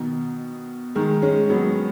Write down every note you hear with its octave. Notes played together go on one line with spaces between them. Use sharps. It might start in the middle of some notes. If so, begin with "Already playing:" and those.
Already playing: B2 D#3
D#3 G#3
G#3 C#4
F#3 B3